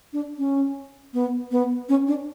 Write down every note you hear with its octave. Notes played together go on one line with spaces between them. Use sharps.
D4
C#4
B3
B3
C#4
D4